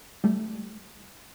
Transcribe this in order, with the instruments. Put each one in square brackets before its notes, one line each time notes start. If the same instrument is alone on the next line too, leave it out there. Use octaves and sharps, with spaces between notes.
[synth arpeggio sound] G3 A3